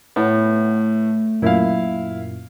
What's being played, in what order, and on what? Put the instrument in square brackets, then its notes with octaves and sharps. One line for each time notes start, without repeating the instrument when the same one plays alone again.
[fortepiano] A2 [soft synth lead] A3 [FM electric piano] B3
[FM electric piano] F#2 A#2 [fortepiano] E4 F5